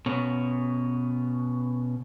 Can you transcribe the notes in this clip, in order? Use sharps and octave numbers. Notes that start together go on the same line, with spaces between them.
B2 C#4